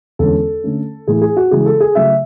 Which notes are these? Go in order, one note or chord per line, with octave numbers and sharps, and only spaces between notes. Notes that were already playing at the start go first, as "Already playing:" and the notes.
E2 D3 G#3 C#4 A4
D3 A3 C#4
A2 E3 A3 G#4
G#4
F#4
C#3 E3 G#3 G#4
A4
G#4
C#3 F#3 A3 E5